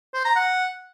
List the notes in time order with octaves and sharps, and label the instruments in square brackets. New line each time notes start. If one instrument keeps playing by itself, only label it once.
[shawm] C5
A#5
F#5